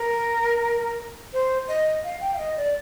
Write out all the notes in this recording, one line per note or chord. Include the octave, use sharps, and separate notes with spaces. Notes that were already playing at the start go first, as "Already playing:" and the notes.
Already playing: A#4
C5
D#5
F5
G5
F5
D#5
D5